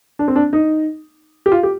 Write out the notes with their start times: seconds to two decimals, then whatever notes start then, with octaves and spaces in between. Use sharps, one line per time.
0.19 D4
0.28 C4
0.36 D4
0.53 D#4
1.46 G4
1.52 F4
1.63 G4